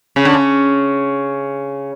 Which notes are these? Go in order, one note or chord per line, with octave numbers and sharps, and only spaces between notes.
C#3
D3
C#3